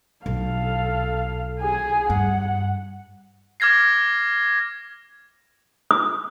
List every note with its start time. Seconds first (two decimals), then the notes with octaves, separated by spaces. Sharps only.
0.26 B1 A4 F5
1.61 G#4 G#5
2.10 G2 F#5
3.60 D6 F6 G#6 A#6 C7
5.91 D#6